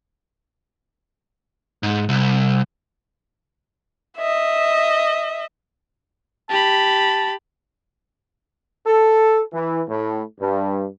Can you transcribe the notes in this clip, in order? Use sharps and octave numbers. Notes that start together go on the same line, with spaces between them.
G#2
C2
D#5 E5
G4 A5 B5
A4
E3
A2
G2